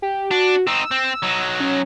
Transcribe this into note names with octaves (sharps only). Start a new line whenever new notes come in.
G4
D4 F#4
C4 D#4 E6
C4
F#3 D#4
C#4